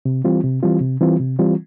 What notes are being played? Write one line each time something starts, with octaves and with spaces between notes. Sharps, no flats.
C3
E3 G3 C4 F4
C3
E3 G3 C4 F4
C3
E3 G3 C4 F4
C3
E3 G3 C4 F4